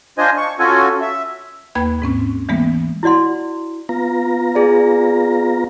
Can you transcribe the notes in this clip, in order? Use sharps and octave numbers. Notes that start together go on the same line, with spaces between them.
D4 F4 C5 D#5 G#5
C#6
C#4 F4 F#4 A4 G#5
E5
D#2 A#3 B4 B5 G#6
G#2 C4 C#4
E3 G3 G#3 A#3 B3
E4 F#4 D5 F#5 C6
B3 F4 A#5
G#4 D5